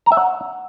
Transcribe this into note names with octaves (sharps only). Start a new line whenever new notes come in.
A#5
E5
F#5